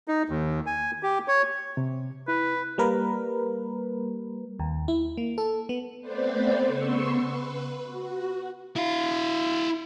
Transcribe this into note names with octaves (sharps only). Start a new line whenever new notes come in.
D#4
D#2
G#5
G4
C#5
C3
E4 B4
G3 A#3 A#4 B4
D#2
E4
A#3
A4
B3
A3 B3 C4 B4 C5 D5
C#3 B3 C6 C#6 E6
B4
F#4
E4 F5